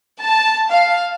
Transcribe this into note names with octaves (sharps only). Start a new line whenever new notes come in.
A5
F5